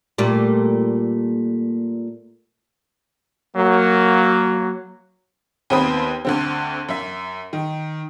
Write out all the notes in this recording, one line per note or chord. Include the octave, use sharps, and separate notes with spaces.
A#2 G3 A3
F#3 A#3
D#2 B3 C4 B4 D#6
D2 D3 C4
F#2 E5
D#3